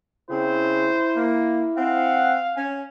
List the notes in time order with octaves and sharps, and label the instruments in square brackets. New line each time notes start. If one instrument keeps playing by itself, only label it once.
[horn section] C#3 C4 [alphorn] E4 [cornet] C5
[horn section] A#3
[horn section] C4 F#5 [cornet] F5
[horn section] C#4 G#5